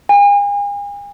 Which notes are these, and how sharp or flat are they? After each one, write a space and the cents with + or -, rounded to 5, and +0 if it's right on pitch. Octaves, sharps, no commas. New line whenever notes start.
G#5 -40